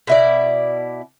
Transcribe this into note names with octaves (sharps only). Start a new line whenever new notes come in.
B2 E4 D5